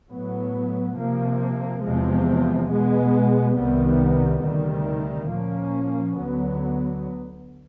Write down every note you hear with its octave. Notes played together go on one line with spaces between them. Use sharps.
A2 F#3 B3
C3 F3 A#3
E2 C3 F3 G#3
B2 G#3 B3
C2 C3 D#3 G3 B3
D2 C3 D#3 G3
A#2 F3 A#3 C#4
D2 D3 F#3 B3